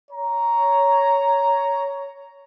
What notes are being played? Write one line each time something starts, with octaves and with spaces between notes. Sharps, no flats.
C#5 A#5